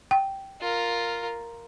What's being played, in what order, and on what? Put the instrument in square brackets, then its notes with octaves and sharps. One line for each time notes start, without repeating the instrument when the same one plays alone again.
[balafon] G5
[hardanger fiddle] F4 A#4